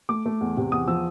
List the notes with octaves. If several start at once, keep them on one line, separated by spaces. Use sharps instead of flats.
A3 D6
A3
E2
C3
E2 D#6
F3 E6